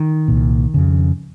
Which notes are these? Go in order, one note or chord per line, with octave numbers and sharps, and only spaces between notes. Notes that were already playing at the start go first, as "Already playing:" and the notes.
Already playing: D#3
C2 A#2
F2 C#3